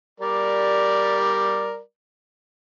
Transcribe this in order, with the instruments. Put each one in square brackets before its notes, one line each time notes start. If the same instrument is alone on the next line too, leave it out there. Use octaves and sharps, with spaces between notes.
[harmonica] G3 A#4 D5